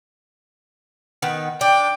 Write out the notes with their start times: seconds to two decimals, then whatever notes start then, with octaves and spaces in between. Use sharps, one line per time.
1.22 D#3 B3 B4
1.61 D4 G5